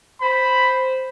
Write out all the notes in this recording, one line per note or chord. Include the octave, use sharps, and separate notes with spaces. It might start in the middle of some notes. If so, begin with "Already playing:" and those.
C5 B5